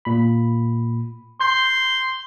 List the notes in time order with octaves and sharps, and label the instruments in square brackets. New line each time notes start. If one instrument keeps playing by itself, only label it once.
[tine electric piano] A#2 B5
[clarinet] C6 [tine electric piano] G6